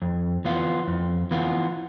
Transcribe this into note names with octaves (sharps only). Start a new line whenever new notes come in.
F2
E3 B3 F4
F2
E3 B3 F4